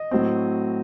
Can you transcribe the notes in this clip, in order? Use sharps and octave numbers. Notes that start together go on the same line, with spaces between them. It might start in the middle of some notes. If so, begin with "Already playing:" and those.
Already playing: D#5
A2 F#3 C4